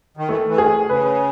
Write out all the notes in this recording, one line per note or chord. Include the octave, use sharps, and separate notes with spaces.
D#3
E3 A3
E3
D#3 G#4
C#3 B4